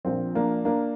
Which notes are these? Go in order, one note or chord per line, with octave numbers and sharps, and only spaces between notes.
A#1 A#2 F3 C4
A#3 D4
A#3 D4